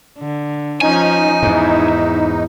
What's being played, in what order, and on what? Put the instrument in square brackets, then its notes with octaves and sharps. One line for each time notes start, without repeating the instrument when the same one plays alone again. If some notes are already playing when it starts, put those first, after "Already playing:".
[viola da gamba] D3
[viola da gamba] F3 C#4 [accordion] D#4 [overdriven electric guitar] G#5
[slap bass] E2 G#2 [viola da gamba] E4